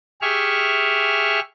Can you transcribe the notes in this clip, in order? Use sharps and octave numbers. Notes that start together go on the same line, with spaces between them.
G4 G#4 E5 C#6 F6